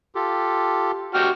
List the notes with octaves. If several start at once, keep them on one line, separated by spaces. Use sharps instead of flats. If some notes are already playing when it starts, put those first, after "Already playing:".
F4 G4 A4
F#4 G4 F6